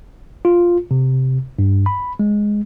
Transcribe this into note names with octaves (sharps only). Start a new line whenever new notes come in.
F4
C3
G2
B5
G#3